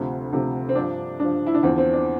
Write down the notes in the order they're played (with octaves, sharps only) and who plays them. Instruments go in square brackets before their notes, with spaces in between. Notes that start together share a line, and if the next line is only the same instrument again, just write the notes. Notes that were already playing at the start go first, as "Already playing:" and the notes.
Already playing: [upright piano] D2 C3 F3
D2 C3 F3
C4
G2 F3 D4
G2 F3 D4
E4
D4
E2 D3 F3 C4
C4
D4